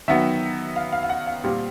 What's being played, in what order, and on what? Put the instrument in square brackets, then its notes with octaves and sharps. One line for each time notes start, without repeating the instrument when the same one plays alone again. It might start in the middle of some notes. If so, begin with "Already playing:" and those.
[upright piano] D#3 F#3 B3 E5
F5
F5
F5
F#5
F5
A#2 G3 C4